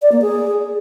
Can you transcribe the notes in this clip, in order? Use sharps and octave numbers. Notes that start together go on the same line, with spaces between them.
D5
A#3
G#4